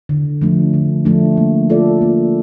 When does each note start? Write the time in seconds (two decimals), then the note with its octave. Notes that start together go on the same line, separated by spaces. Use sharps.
0.09 D3
0.42 F3 A3 D4
0.74 D3
1.05 F3 A3 D4
1.37 A#3
1.70 F4 A4 D5
2.02 A#3